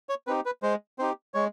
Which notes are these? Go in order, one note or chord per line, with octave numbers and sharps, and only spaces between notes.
C#5
C4 D#4 G4 B4
B4
G#3 C5
C4 D#4 G4 C5
G#3 C#5